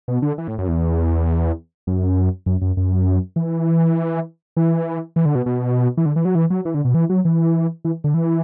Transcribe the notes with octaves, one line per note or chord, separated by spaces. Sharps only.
B2
D3
E3
A2
F#2
E2
F#2
F#2
F#2
F#2
E3
E3
E3
D3
B2
B2
E3
D3
E3
F#3
E3
F#3
E3
D3
B2
E3
F#3
E3
E3
D3
E3